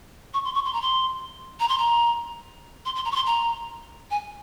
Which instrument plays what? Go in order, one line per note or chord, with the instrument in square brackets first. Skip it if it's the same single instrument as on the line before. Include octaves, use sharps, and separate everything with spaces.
[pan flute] C#6
C6
C#6
C6
A#5
C6
A#5
C6
A#5
C6
C6
A#5
C#6
C6
A#5
G#5